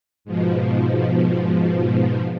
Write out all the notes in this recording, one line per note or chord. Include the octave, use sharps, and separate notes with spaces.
G#2 B2 F3